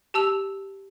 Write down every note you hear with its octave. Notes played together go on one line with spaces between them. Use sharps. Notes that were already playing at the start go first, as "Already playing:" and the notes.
G4 A5 E6 F7